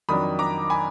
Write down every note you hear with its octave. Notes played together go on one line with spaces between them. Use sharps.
F2 D#3 F#3 D4 B5 D#6
A#5 D6
G#5 B5